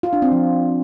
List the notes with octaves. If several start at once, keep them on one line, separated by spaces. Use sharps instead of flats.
F4
D4
C4
F3